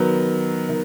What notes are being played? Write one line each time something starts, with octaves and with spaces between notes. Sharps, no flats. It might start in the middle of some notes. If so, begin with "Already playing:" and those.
Already playing: D#3 F#3 B3
D#3